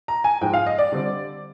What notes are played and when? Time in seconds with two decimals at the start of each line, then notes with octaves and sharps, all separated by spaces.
0.08 A#5
0.24 G#5
0.41 G#2 F3 G#3 D#4 G5
0.53 F5
0.66 D#5
0.78 D5
0.92 D3 G3 C4